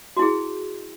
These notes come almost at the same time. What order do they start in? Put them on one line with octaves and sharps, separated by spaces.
F#4 E4 G#4